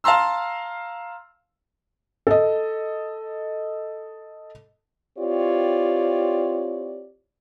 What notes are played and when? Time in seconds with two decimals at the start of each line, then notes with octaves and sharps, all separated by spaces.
0.04 F5 A5 A#5 C6 E6
2.27 A4 D#5
5.18 C4 E4 F4 G4 C#5 D5